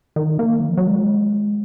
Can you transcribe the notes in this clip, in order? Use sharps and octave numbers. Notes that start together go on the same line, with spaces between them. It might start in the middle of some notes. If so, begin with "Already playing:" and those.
D#3
A#3
D#3
F3
F#3
G#3